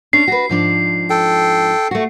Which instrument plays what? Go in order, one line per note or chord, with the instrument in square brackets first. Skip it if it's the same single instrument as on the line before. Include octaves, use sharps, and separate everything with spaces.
[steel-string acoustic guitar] C#4 D4 [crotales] C7
[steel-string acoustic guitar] F#4 B4
G#2 F3 D4
[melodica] A4 G5
[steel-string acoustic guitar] A3 F#4